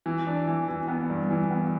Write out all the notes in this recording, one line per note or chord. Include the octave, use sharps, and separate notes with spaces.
E3
D4
E3
E3
B3
G2
E3
B3